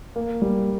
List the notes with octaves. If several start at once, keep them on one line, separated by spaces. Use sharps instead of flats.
A#3
G3